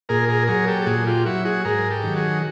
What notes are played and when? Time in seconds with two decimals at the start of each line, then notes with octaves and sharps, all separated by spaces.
0.09 A#2 G#4 A#4
0.29 G#4 A#4
0.47 F#3 G#4 A#4
0.67 G4 A4
0.82 A4
0.86 A#2 F#4 G#4
1.06 F4 G4
1.26 F#3 E4 F#4
1.45 F#4 G#4
1.65 G#2 G#4 A#4
1.90 G4 A4
2.04 D#3 F#3
2.16 F#4 G#4